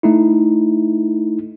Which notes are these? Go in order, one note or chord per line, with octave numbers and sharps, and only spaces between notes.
A3 D#4 E4